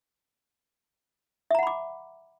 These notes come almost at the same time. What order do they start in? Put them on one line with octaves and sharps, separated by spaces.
E5 A#5 F#5 B5 D6